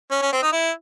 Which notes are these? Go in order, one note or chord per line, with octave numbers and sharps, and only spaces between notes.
C#4
C#4
C4
D#4
E4